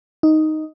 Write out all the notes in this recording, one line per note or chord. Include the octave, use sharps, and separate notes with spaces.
D#4